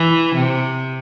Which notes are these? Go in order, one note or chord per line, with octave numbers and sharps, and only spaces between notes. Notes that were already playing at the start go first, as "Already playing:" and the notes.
Already playing: E3
C3